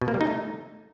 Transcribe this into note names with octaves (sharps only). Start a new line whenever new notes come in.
B2
A#3
G3
D#4
A3